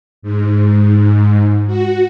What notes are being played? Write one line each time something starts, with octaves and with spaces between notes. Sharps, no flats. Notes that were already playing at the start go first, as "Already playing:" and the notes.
G#2
F#4